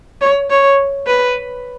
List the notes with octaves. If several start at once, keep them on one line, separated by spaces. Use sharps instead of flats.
C#5
C#5
B4